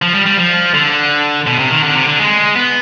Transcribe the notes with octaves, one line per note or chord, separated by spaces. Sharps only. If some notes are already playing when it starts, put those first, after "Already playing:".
F3
G3
G3
F3
D3
B2
C3
D#3
D3
C3
D3
G#3
B3